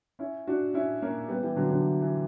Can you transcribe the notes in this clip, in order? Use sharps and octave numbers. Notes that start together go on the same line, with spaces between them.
C#4 E4
D4 F#4
C#4 E4
A#3 C#4
G3 B3
E3 G3
D3 F#3
D3 F#3
E3
E3